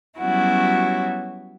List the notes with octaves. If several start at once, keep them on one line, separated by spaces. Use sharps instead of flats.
F#3 G3 B3 C#4 E4 F#4